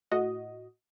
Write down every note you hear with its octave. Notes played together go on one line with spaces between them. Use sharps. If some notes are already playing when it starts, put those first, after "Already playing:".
A2 F#4 D#5